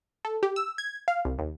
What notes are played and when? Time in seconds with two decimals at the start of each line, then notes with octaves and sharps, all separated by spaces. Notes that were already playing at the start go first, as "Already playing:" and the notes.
0.25 A4
0.43 G4
0.56 E6
0.78 G#6
1.08 F5
1.25 C2
1.38 D#2